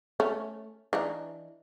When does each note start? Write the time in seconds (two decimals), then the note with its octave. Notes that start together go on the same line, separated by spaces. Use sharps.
0.20 A3 C#4
0.93 E3 D4 D#4